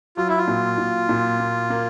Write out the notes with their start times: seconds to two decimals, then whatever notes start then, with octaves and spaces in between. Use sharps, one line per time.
0.17 F#3 F4
0.28 E4
0.38 F4
0.47 A#2
0.78 A#2
1.09 A#2
1.40 A#3
1.70 A#3